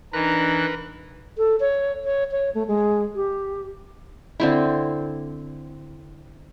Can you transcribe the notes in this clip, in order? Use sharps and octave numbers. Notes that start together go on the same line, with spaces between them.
E3 D4 D#4 A#4 B4 A#5 F#6
A4
C#5
C#5
C#5
A3
G#3
G4
D3 C4 E4